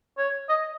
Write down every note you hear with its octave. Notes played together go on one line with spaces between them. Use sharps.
C#5
D#5